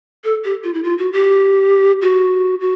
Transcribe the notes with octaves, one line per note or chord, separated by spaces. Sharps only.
A4
G4
F4
E4
F4
F#4
G4
F#4
F#4